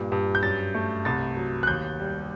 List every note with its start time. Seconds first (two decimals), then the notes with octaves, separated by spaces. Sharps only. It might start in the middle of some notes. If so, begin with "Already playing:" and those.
Already playing: G2 A#2
0.12 G2
0.35 G6
0.43 F#2 A6
0.75 A3
1.05 C2 A6
1.37 F#3
1.63 F#6
1.67 D#2 G6
2.00 G3